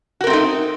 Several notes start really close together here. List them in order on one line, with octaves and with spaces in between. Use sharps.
F#4 A#4 C4 A3 D#4